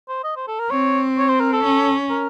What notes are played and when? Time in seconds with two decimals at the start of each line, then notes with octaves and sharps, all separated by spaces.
0.09 C5
0.24 D#5
0.36 C5
0.48 A4
0.59 A#4
0.70 C4 C#5
1.18 C#5
1.29 C5
1.40 A#4
1.53 A4
1.64 C#4
2.10 A#4